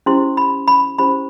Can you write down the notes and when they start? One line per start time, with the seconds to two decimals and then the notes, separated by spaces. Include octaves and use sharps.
0.06 C#4 E4 G4 C5 C6
0.37 B5
0.68 B5
0.98 C#4 E4 G4 C5 B5